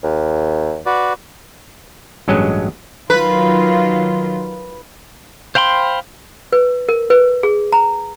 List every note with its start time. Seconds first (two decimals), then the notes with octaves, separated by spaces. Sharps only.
0.04 D#2
0.86 F#4 B4 D5
2.28 A1 G2 F#3 G#3 C#4 D#5
3.10 D#3 F#3 F4 B4
5.55 C5 F5 G5 B5 C6
6.53 B4
6.89 A#4
7.10 B4
7.43 G#4
7.73 A#5